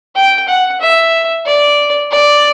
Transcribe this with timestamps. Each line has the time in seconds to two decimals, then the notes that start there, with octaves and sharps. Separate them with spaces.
0.15 G5
0.48 F#5
0.81 E5
1.46 D5
2.11 D5